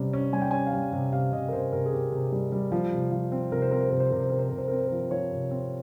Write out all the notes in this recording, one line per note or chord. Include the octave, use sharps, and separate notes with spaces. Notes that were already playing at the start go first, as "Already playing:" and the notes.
Already playing: C3 G3 C#4
C#4
G3 G#5
G5
C#4 G#5
F5
G3 G5
C3
C3 F5
C3 D#5
A#4
C3 C5
C3 A#4
G#4
C3 G4
C3
G3
G3
F3
C3
F3
C4
C3 A#4
C5
C4 A#4
C5
C3 A#4
C5
C3 A#4
C5
C3 A#4
C5
C3 A#4
C5
C4 A#4
C5
F3 A#4
F3 C#5
C3
C4